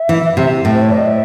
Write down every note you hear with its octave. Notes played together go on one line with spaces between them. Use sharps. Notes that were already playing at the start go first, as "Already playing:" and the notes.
Already playing: E5
E3
C3
A2 E5
C5
C#5
D5
D#5
E5